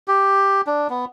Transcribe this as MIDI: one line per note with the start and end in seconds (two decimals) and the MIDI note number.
0.08 0.61 67
0.67 0.88 62
0.90 1.05 59